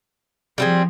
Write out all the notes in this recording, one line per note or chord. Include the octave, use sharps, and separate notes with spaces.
F3 G3 C4 E4 G#4